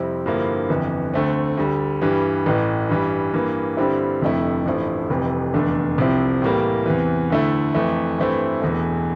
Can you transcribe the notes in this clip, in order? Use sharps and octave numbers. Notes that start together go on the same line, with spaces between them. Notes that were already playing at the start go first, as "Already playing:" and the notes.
Already playing: F2 C3 G3 C4 E4
G2 D3 F3 A#3 E4
G1 F2 E3
D2 D3 A3 C4
D2 D3 G3
G2 E3 G3
A1 A2 E3
G2 E3 G3
G2 E3 A#3
G2 D3 G3 C4 E4
F1 F2 D3 A3 E4
A1 G2 F3 A3 E4
F1 F2 C3 E3 G3
F1 E2 D3 A3 D4
C2 C3 F3 C4 E4
A2 E3 G3 A#3
E2 C3 E3
D2 D3 A3 E4
F2 E3 A3
G2 E3 A3 C4 E4
E1 E2 E3 A3